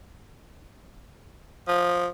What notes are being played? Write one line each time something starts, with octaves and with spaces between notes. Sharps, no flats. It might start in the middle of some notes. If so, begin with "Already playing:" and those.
F3